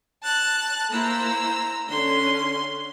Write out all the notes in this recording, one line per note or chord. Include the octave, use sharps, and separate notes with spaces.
A5 F#6
A#3 E4 C5 A#5 E6
D3 C#4 C6